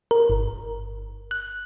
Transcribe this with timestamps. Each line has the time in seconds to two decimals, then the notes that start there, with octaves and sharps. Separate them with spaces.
0.11 A#4
0.30 G1
1.31 F#6